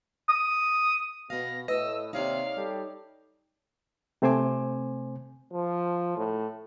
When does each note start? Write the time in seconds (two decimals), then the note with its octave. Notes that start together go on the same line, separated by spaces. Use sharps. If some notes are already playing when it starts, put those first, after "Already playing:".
0.29 D#6
1.30 B2 B3 F5 A#6
1.68 A2 B4 D#5 E6
2.13 D#2 C3 D#4 C#5 D5 F5
2.56 G3 G4 A4
4.22 C3 A3 C4 C5 G#5 D6
5.53 F3
6.17 A2